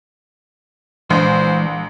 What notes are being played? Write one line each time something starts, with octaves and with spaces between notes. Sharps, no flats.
A#1 E3 G#3 C5 C6